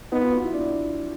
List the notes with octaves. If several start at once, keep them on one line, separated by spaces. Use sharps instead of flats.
B3 D#4
F4
F#4
E4
D4